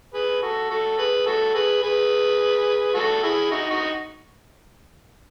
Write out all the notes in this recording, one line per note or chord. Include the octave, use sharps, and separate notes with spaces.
G#4 B4
F#4 A4
F#4 A4
G#4 B4
F#4 A4
G#4 B4
G#4 B4
F#4 A4
E4 G#4
D#4 F#4
D#4 F#4